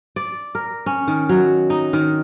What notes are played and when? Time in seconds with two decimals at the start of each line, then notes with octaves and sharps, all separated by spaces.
0.16 D5
0.55 A#4
0.86 C#4
1.07 D#3
1.29 F#3
1.70 D#4
1.93 D#3